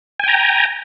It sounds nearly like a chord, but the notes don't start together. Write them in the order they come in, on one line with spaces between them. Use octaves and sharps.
G#5 G5 A#5